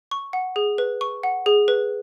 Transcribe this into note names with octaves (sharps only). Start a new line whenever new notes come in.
C#6
F#5
G#4
B4
C#6
F#5
G#4
B4